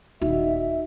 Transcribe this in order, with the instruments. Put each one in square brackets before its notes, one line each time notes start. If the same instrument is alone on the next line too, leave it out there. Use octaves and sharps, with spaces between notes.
[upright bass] D#1 [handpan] D#4 F#4 [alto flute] E5